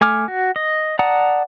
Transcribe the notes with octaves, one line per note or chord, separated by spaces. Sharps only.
A3 G#5 D6 F6
F#4
D#5
D5 F#5 A5 A#5 D#6